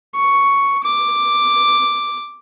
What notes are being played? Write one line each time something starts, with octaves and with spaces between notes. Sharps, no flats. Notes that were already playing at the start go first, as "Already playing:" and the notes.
C#6
D6